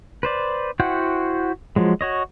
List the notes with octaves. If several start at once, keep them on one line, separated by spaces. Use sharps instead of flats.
B4 C5 D5
E4 F#4 C5 F#5 G5
F3 F#3 G#3
F#4 C#5 D#5